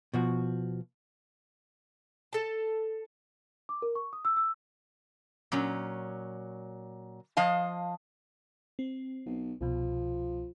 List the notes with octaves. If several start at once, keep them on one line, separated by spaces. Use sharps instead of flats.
B2 F3 F#4
A4 A5
D6
A#4
C#6
D#6
E6
E6
A#2 F#3 C#4
F3 D#5 F5 A5
C4
B1
C2 B2 F3